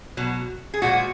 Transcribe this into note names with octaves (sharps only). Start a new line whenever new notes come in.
B2 F#3
G#4
A#2 F3 G#3 F#4